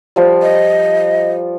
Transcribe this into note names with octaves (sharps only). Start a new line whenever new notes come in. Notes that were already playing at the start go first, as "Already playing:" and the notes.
F3 G3
D#5